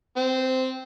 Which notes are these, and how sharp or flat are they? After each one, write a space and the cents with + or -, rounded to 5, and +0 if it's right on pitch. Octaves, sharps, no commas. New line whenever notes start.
C4 -10